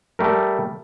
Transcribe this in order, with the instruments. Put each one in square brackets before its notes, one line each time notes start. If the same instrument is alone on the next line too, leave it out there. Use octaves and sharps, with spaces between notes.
[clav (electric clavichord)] G3 A3 A#4